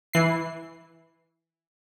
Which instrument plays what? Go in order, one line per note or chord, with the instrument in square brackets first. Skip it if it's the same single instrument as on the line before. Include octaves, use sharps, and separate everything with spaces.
[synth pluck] E3 C7